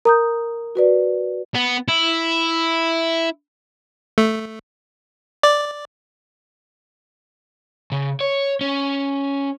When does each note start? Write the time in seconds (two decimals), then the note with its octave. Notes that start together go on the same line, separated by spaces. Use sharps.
0.05 A#4 A#5 D#6 G6
0.75 F#4 B4 D5
1.55 B3
1.88 E4
4.18 A3
5.43 D5
7.92 C#3
8.21 C#5
8.61 C#4